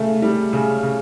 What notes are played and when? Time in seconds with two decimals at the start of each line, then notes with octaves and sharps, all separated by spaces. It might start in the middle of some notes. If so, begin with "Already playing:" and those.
Already playing: C#3 A3
0.22 G3
0.53 C#3
0.83 C#3